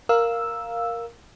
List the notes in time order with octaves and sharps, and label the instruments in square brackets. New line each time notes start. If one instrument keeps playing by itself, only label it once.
[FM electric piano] A#4 F5 E6